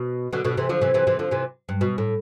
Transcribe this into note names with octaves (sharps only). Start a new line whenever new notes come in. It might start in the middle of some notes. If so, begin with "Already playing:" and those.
Already playing: B2
B2 D3
B2 D3
C3 E3
D3 F3
C3 E3
C3 E3
C3 E3
D3 F3
C3 E3
G2
B2
A2